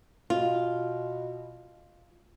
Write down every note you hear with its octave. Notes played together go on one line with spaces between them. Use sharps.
B2 F4